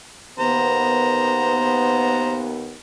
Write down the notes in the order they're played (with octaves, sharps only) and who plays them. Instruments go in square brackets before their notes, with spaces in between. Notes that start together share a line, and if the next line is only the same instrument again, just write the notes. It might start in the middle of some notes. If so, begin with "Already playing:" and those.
[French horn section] D#2 B3 [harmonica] C5 A#5